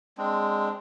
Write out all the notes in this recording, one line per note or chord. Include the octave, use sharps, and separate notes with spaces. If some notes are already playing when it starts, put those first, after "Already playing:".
G#3 C4 D4